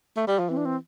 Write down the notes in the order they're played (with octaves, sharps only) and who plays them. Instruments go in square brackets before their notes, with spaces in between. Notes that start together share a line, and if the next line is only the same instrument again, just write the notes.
[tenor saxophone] A3
G3
F3
[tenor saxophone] E3 [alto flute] C4
[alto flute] D4
C4